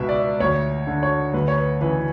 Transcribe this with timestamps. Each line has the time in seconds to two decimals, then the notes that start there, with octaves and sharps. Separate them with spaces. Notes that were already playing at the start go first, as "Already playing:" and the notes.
Already playing: C#2 B2 E5
0.09 D5
0.40 D2 C#5
0.87 D3
1.03 C#5
1.34 D2 B4
1.48 C#5
1.58 B4
1.81 C#3 E3 B4